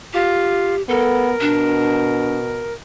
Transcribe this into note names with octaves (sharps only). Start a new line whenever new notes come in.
F4 G4
B3 A4 A#4
B2 D4